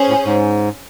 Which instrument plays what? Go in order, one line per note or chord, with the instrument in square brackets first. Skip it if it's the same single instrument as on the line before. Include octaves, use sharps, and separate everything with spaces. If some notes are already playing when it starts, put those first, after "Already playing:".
Already playing: [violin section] C#4 G#4 C5
[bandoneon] A2
G#2